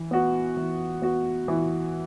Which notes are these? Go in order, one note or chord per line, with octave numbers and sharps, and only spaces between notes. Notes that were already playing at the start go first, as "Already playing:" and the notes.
Already playing: E3
B3 F#4
E3
B3 F#4
E3